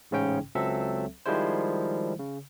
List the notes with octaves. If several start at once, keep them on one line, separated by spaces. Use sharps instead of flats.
A1 G#2 C#3 C#4 G5
C#2 F#3 C4 A4 E5
D#3 F3 G3 G#3 E4 C5
C#3